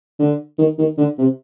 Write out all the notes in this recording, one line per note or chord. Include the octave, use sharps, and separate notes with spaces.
D3
D#3
D#3
D3
C3